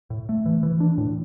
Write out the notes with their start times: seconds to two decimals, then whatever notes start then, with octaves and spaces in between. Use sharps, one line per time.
0.10 A2
0.29 A3
0.46 E3
0.63 E3
0.80 D4
0.98 A2